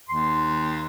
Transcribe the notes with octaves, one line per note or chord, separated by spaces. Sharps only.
D#2 C6